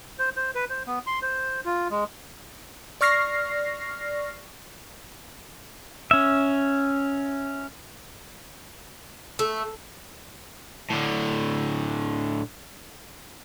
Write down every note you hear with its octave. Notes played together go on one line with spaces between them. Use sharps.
C5
C5
B4
C5
B3
C6
C5
F4
G#3
D5 C#6 F6 A#6 C7
C#4 E5
A3
A2 D3